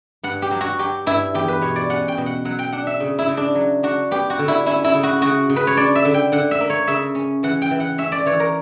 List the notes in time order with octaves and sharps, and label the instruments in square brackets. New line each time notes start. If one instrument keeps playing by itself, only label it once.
[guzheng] G2 F#5
G4
F#3
F#4
F#3 G4
G2 E4
E2 G4
B4
B2 C#5
D5
C#4 F#5
G5
B2
F#5
F#3 F#5
G5
D4 F#5
E5
C#3
E4
C#3
D4
F#3
D4 F#4
B3 G4
F#4
D3
E4
C#4 E4
E4
C#3
F#4
C#3 F#4
C#3
B4
C#5
D4 D5
E5
D3
G5
D3 F#5
E5
A#3
C#5
C#3 E5
C#4
E3 F#5
G5
E3
F#5
C#4 E5
D5
E3 C#5
A#4